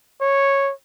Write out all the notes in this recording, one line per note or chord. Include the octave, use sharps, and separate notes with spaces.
C#5